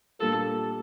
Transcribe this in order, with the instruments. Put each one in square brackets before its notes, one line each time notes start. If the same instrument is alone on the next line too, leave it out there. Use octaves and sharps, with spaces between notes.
[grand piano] A#2 G3 D4 F4 A#4 [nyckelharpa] A4